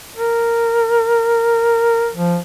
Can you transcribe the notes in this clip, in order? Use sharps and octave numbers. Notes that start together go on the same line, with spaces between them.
A#4
F3